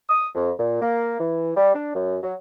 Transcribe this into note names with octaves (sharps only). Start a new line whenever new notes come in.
D#6
F2
A#2
A#3
E3
G3
D4
F#2
F#3